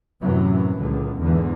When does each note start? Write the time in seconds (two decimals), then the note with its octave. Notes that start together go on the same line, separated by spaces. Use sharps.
0.22 F#2 A2 C3 E3 F#3
0.76 C#2 A#2 D3
1.21 E2 G#2 D3 E3